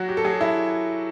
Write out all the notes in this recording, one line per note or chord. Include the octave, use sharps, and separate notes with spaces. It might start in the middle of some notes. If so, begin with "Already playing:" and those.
Already playing: F#3 F#4
G4
A4
F#3 G#4
E4